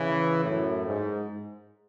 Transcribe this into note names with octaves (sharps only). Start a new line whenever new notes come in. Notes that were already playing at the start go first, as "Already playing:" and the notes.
Already playing: C#3 E3
F#2 A2
G#2